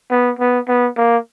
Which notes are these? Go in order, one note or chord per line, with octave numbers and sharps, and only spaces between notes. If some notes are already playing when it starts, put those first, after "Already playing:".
B3
B3
B3
A#3